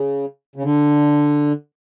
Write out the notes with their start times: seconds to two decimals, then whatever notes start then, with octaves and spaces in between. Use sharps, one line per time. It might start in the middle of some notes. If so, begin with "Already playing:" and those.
Already playing: C#3
0.56 C#3
0.63 D3